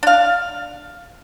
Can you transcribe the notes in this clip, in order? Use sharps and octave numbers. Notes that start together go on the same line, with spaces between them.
D4 F5